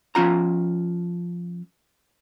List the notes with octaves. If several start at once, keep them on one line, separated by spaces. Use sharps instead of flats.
F3 C#4 F4 A#5